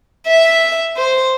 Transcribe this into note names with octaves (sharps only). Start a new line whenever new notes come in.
E5
C5